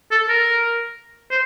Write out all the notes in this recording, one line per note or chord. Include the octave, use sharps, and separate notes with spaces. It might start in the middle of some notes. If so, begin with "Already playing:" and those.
A4
A#4
C5